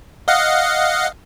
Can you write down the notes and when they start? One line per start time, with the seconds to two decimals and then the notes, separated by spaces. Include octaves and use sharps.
0.28 D#5 F5 F#5